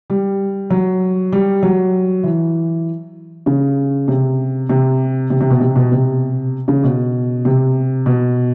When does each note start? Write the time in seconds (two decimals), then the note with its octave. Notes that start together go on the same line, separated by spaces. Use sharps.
0.10 G3
0.70 F#3
1.32 G3
1.63 F#3
2.23 E3
3.46 C#3
4.08 C3
4.69 C3
5.30 C3
5.41 C3
5.50 B2
5.61 C3
5.76 B2
5.92 C3
6.68 C#3
6.84 B2
7.45 C3
8.06 B2